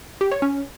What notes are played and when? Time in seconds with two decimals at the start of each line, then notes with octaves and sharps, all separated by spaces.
0.21 G4
0.31 C#5
0.42 C#4